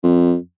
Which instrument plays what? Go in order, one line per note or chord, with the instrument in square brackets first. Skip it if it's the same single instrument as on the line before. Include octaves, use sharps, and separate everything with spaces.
[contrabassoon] F2